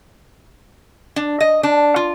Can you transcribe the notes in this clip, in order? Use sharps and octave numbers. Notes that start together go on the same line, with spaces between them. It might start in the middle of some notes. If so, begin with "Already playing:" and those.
D4
D#5
D4
F4